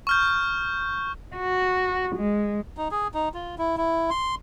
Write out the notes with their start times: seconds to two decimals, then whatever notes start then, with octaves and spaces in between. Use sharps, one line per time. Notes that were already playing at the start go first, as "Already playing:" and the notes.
0.07 C#6 F6 G6
1.37 F#4
2.16 G#3
2.77 D#4
2.91 G#4
3.14 D#4
3.34 F4
3.58 E4
3.77 E4
4.10 C6